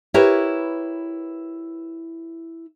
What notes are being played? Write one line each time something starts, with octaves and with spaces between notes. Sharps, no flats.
E4 G4 A#4 B4 C#5